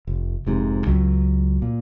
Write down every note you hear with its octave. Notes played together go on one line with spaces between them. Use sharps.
F1
F1 G#2 C3
C#2 F#3
A#2